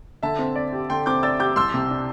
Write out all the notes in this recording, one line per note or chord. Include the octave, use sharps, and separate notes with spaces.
D3 E5 A5
C4
D5
G4
D3 G5 C6
C4 D6 G6
D5 E6 A6
G4 D6 G6
C2 C6 E6
C3
D4